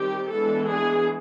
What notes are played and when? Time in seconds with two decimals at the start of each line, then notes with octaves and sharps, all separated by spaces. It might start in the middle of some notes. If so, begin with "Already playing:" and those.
Already playing: D#3 G3 C4 G4
0.32 E3 G#3 B3 D4 A4
0.71 G#4